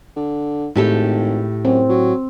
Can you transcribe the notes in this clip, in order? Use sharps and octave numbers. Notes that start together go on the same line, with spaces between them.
D3
G#1 A2 G4 A4
F#2 C4
F#3